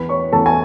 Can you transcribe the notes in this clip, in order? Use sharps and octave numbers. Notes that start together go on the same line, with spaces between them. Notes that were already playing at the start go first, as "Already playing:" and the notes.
Already playing: E2 B4 B5
C#5 C#6
E2 A4 A5
G#5